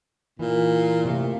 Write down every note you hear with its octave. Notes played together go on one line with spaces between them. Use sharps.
A#2 E3
C3 A3 F5